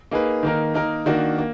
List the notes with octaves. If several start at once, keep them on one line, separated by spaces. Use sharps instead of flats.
A#3 D#4 G#4 B4
D#3 A#3 D#4 A#4
A#3 D#4 A#4
D#3 A#3 D4 F#4
A#3